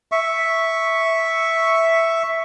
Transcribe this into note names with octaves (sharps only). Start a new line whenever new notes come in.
E5 C#6